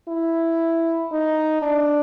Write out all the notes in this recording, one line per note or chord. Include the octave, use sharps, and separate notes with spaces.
E4
D#4
D4